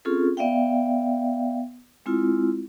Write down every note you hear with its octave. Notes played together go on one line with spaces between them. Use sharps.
C4 C#4 F4 G#4 A4
B3 D5 E5 F5 G5
G#3 C4 E4 F4